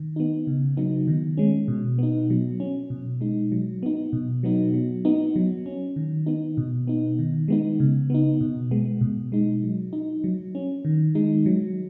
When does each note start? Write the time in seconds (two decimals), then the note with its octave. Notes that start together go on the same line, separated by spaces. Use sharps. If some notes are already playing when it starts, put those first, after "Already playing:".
Already playing: D#3
0.16 B3 D#4
0.47 C#3
0.77 F#3 B3 D#4
1.08 D#3
1.37 G#3 C#4
1.68 B2
1.99 B3 D#4
2.30 F#3
2.60 C#4
2.90 B2
3.21 G#3 D#4
3.52 F#3
3.83 B3 D#4
4.13 B2
4.43 F#3 B3 D#4
4.74 F#3
5.05 B3 D#4
5.36 F#3
5.66 C#4
5.96 D#3
6.26 B3 D#4
6.57 B2
6.87 B3 D#4
7.19 D#3
7.48 G#3 B3 D#4
7.80 C#3
8.10 B3 D#4
8.41 B2
8.71 G#3 B3
9.01 B2
9.32 G#3 D#4
9.63 F#3
9.93 D#4
10.24 F#3
10.55 C#4
10.85 D#3
11.15 G#3 D#4
11.46 F#3